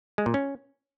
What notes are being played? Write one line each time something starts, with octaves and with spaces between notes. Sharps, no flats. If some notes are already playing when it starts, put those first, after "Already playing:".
G#3
A#2
C#4